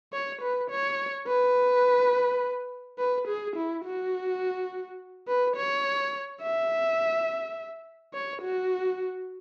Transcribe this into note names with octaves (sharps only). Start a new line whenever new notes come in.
C#5
B4
C#5
B4
B4
G#4
E4
F#4
B4
C#5
E5
C#5
F#4